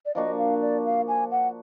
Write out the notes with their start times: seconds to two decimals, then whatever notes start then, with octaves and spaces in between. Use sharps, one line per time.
0.06 D5
0.15 F3 A#3 D4 F#4 D#5
0.38 F5
0.61 D5
0.85 F5
1.08 G#5
1.31 F#5